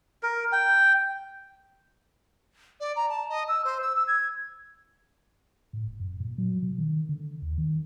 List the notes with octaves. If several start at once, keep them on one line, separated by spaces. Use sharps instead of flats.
A#4
G5
D5
A#5
A5
D#5
E6
C5
E6
E6
G#6
A2
E1
F#2
A#2
F#3
B2
D#3
D3
D#2
D#3